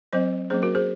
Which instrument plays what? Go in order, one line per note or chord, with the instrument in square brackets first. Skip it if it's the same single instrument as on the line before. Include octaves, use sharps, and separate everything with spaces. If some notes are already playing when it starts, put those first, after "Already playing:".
[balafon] F#3 C4 C5 D#5
F#3 A#3 C#4 G#4 C5
F#4 A#4
G#4 C5